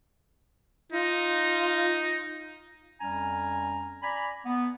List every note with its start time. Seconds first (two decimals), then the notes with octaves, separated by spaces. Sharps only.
0.92 D#4 F4
3.01 F2 G3 C#4 G#5 A#5
4.02 D5 G#5 A#5 B5
4.45 B3